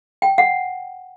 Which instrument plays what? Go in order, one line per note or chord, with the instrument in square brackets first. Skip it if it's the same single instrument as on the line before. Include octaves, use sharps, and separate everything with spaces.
[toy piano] G5
F#5